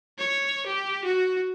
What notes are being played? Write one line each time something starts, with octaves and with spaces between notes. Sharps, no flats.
C#5
G4
F#4